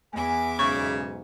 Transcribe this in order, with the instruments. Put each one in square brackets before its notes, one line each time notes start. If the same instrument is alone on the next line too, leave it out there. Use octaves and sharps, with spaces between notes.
[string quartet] E2 E5 D6 [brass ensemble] G#5
[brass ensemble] B1 G#2 [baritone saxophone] C#3 [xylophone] C#6